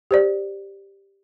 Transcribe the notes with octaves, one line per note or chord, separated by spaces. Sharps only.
G4 C5 D5